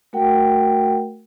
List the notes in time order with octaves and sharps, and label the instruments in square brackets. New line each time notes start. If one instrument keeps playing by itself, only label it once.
[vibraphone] A3 F#4 A#4 F#5 G5